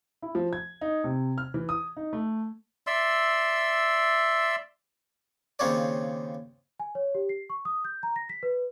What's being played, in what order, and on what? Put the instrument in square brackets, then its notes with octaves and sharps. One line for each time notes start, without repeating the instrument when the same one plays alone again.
[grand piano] E4
F3
G#6
D#4
C3
F6
E3
D#6
D#4
A3
[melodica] D5 E5 C6 E6
[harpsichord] D#2 C#3 C4 F4 C#5 D5
[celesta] G#5
C#5
G4
C7
C#6
D#6
G6
A#5
A#6
B6
B4